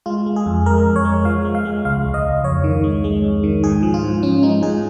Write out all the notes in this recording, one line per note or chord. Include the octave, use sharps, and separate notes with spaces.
G#3 F4
G#3
G#4
F2
G#3 A#4
F2
C#5
G#3
F3 F5
G#3
F5
G#3
C#2 F5
C#2
D#5
C#2
F2 C#5
D#3
G#3
G#3
F2
D#3
G#2 G#4
F3
F4
G#2
F3 C#4
G#3 D#4
G#2 G#4